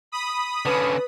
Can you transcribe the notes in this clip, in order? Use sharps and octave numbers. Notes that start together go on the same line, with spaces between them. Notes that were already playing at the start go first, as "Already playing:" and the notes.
B5 D#6
D3 C#4 B4